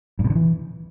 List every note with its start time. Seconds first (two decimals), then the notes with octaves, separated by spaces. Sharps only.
0.19 G2
0.25 B2
0.30 D3
0.35 E3